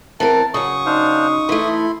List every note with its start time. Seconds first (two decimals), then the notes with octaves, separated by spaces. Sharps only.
0.20 E3 C4 A#4 A5
0.54 C#3 F#3 C#6 D#6
0.86 D4 D#4 C5 F5
1.49 E3 A3 E4 B5 C6